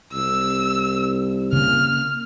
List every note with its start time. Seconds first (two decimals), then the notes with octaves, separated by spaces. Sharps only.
0.13 C2 E6
1.53 C#3 A#3 F6